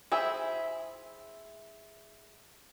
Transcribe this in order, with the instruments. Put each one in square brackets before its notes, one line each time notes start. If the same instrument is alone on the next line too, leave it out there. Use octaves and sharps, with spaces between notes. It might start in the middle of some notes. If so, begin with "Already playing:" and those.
[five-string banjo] E4 G#4 C5 E5